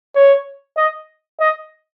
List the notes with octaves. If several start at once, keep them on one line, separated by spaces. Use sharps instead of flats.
C#5
D#5
D#5